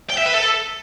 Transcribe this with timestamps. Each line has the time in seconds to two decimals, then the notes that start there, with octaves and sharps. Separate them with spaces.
0.10 G5
0.18 E5
0.26 B4
0.34 A4